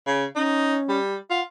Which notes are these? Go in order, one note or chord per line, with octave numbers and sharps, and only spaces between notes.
C#3
C#4 D#4
G3
F4 F#5